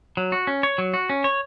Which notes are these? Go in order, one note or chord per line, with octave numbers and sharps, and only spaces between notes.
F#3
F#4
C#4
C#5
F#3
F#4
C#4
C#5